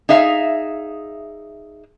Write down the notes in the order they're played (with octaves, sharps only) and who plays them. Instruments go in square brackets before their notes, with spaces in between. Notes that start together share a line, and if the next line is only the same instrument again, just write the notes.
[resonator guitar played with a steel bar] D#4 G#4 E5 F5